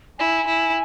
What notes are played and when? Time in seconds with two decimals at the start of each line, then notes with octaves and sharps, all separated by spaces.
0.19 E4 G#5
0.47 E4